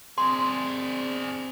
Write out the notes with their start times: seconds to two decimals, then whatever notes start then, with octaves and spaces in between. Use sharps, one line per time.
0.18 C4 D4 G#4 C6